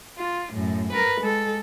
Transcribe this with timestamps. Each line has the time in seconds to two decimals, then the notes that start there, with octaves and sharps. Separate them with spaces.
0.18 F4
0.52 F#2 A2
0.92 A#4 B4
1.21 G#3 A4